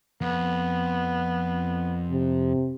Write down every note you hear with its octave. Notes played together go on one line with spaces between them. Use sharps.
F2 B3
C3